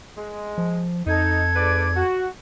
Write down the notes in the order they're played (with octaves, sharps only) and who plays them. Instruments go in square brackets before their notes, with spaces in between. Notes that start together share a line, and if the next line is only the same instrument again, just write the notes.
[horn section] G#3
[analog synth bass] F3
[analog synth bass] F2 [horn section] D#4 [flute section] A4 G#6
[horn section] G#2 B4 D5
F#4